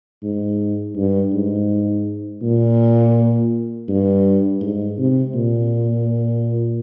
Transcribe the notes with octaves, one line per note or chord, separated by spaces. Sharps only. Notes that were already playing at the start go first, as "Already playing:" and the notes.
G#2
G2
G#2
A#2
G2
G#2
C3
A#2